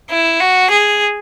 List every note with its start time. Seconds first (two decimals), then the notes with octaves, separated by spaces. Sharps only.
0.11 E4
0.41 F#4
0.71 G#4